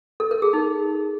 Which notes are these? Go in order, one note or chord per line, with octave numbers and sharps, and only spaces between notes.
A4
A#4
G#4
D#4